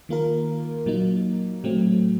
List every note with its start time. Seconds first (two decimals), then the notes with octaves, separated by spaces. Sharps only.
0.09 D#3 A#3 F4 A#4
0.86 A#2 F#3 A#3 D#4
1.64 A2 F#3 A3 C4